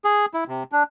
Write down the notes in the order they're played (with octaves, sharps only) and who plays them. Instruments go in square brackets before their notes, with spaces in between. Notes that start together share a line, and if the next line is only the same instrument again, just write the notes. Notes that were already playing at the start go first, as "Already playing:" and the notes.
[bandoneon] G#4
E4
C3
D4